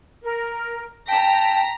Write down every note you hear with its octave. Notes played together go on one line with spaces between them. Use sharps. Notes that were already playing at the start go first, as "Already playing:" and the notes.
A#4
G5 A5 A#5 A#6 B6